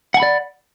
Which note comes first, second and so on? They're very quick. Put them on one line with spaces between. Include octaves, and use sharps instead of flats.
F#5 G#5 B5 D5